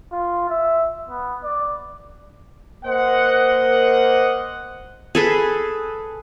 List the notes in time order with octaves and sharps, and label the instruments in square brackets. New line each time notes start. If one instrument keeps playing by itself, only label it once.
[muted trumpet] F4
E5
B3
D5
[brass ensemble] A#3 A#4 C5 D#5 F#5
[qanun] G#4 A4 B4